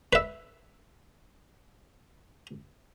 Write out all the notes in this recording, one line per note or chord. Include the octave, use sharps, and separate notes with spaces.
B4 E5